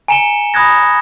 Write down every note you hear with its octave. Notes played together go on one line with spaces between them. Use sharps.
G#5 A#5 C#7 E7 F7 G7
B5 D#6 F#6 G#6 A#6